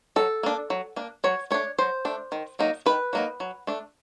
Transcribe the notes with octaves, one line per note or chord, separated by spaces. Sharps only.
F#3 A4
A#3 D4
F#3
A#3 D4
F#3 C#5
A3 D4 C#5
F#3 C5
A3 D4
D#3
F#3 A#3 D#4
D#3 B4
F#3 A#3 D#4
F#3
A3 D4